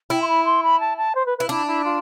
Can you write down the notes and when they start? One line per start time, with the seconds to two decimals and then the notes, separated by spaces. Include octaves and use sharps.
0.10 E4 G5
0.21 C6
0.28 B5
0.45 C6
0.63 B5
0.80 A5
0.97 A5
1.15 C5
1.26 B4
1.38 E4 B4
1.49 D4 E4
1.66 E4
1.84 F4